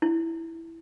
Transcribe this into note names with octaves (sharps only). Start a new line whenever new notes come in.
E4